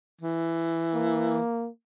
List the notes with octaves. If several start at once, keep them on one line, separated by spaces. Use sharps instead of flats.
E3
A#3